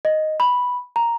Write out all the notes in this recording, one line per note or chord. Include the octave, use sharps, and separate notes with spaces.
D#5
B5
A#5